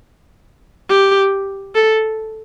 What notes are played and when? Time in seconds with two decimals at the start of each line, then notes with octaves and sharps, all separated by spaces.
0.89 G4
1.75 A4